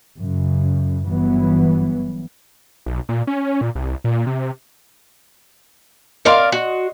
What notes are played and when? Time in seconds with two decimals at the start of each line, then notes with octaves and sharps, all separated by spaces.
0.18 F#2 C#3
1.07 G1 G2 E3 F#3 B3
2.86 B1
3.09 A#2
3.27 C#4
3.61 A#2
3.75 C2
4.04 A#2
4.27 C3
6.25 A#4 D5 D#5 F5 C6
6.52 F#4